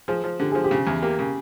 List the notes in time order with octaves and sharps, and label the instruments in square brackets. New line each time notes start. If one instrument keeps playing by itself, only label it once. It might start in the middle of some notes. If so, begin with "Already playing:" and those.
[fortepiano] F3 [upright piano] G#4
[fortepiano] F3
[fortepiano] D3 [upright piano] G4
[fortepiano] F3 [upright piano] G#4
[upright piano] G4
[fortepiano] C#3
E2
[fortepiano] A#3 [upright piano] G4
[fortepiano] C#3